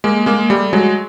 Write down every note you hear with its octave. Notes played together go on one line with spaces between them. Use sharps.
G#3 A#3
G#3 A#3
G3 A3
F#3 G#3